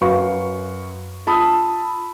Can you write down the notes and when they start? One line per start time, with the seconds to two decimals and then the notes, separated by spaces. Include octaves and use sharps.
0.01 F#2 F#4 B4 F5 C#6
1.26 F4 A5 B5 D#6 E6